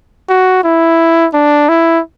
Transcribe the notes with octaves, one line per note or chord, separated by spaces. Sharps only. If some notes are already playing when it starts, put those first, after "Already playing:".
F#4
E4
D4
E4